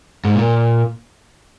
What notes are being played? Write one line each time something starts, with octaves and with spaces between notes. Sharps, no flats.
G#2
A#2